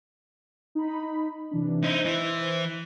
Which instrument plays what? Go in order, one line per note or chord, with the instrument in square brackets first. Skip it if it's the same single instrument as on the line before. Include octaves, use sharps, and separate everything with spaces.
[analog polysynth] D#4 B5
C3 E3 D4
[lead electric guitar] D#4 E4 [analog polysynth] C5
[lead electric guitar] E3 E4